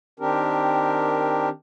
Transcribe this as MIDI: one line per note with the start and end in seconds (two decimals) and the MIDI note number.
0.20 1.49 51
0.20 1.49 60
0.20 1.49 62
0.20 1.49 67
0.20 1.49 70